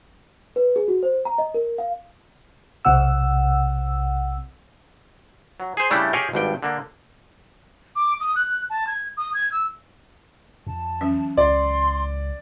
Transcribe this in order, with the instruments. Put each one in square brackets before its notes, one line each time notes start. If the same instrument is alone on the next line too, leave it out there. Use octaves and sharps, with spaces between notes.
[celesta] B4
G#4
F#4
C5
A#5
D#5
A#4
F5
[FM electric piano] B1 C3 C4 F#5 E6
[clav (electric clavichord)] F#3
G#4 C5
C#3 G3 A3 D4 E4 G4
G4 G#4 C#5 D#5 F5 G5
G#1 G2 G5
D3 A#3
[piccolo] D6
D#6
F#6
A5
G#6
D#6
G#6
E6
[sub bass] F2 [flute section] A5
[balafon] E3 F#3 C#4
[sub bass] C#2 [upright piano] D5 [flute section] C6